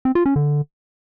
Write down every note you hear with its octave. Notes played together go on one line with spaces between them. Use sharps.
C4
F4
C#4
D3